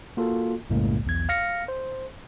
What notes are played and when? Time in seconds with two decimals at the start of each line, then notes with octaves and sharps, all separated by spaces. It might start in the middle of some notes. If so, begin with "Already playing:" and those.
0.17 A#3 F4 F#4 A4
0.70 B1 F#2 A2 C#3 G#3 A#3
1.05 B1 E2 G#6
1.29 F5 F6 A#6 C#7
1.68 C5